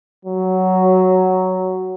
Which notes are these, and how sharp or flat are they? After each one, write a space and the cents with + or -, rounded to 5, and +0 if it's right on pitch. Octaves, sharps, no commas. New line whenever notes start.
F#3 +5